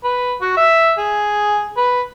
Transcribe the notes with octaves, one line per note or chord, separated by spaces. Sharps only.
B4
F#4
E5
G#4
B4